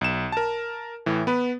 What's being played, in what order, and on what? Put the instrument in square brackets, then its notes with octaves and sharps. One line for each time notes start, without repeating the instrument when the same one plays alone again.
[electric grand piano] B1 E7
A#4 A5
A2 E3
B3 B4